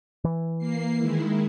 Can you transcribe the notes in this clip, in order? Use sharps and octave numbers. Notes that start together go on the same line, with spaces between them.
E3
A#3 C7
D#3 G#3 E4